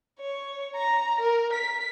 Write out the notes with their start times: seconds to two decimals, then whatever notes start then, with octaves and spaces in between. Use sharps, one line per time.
0.19 C#5
0.76 A#5
1.20 A#4
1.53 B6